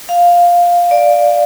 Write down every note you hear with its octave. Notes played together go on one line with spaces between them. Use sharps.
F5
D5